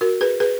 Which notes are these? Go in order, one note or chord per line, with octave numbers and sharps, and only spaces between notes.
F#4 A#4
G#4 B4
G#4 B4